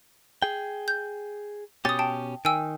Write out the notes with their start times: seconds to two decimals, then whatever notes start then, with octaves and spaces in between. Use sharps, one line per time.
0.42 G#4 G5
0.88 G6
1.85 B2 C#4 G4 D#6 A6
1.99 G5 A5
2.45 D#3 G5 G#5 E6